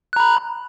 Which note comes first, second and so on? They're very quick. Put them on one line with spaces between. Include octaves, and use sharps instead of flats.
F#6 A#5 B5